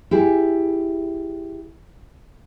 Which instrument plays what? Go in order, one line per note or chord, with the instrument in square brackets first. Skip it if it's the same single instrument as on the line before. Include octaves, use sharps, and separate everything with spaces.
[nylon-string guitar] E4 G4 G#4